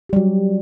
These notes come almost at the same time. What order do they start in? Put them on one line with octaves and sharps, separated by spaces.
G4 G3 F#3